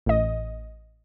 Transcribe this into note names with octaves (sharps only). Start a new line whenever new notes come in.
A1 D#5